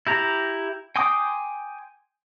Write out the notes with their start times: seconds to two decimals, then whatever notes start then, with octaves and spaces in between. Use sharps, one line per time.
0.07 E4 G4 A#5
0.96 G5 G#5 C6 D6 D#6